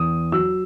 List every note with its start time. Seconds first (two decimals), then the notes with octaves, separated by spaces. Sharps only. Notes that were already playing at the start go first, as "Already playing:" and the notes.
Already playing: E2 D#6
0.32 F#3 E6